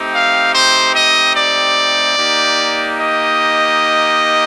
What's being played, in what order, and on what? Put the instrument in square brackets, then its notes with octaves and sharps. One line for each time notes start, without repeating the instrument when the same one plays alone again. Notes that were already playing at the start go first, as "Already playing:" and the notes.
Already playing: [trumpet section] A3 C4 D#4 G4
F5
C5
D#5
D5
A#3 D#4 G4
D#5